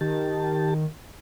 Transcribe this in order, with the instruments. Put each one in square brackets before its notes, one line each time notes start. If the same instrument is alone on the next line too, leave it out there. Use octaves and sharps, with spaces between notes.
[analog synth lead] D#3 [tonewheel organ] G4 A5